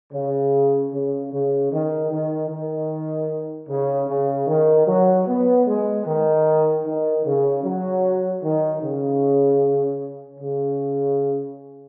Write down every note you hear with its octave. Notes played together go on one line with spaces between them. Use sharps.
C#3
C#3
C#3
D#3
D#3
D#3
C#3
C#3
D#3
F#3
B3
G#3
D#3
D#3
C#3
F#3
D#3
C#3
C#3